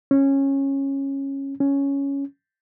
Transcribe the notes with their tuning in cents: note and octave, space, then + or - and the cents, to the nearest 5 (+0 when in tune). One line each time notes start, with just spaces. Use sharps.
C#4 -15
C#4 +5